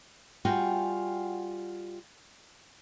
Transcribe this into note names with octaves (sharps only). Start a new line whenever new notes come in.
G3 F4 F#4 G5 G#5